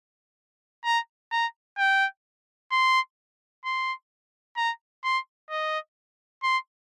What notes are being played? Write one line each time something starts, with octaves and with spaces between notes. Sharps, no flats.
A#5
A#5
G5
C6
C6
A#5
C6
D#5
C6